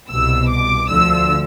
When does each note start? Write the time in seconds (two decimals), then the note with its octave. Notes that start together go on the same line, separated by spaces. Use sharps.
0.10 C2 B2 E6
0.49 D6
0.89 D2 D3 F3 E6